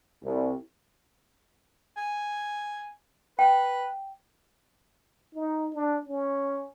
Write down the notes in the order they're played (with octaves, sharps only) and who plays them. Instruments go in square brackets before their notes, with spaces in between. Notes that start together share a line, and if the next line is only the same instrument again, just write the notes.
[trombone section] C2
[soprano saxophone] G#5
[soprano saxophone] B4 [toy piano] G5
[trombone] D#4
D4
C#4